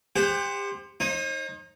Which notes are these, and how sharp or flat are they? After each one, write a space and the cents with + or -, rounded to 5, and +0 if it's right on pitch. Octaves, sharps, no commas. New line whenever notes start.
G4 +35 C5 +0 F#5 +5
D#4 +0 C5 +45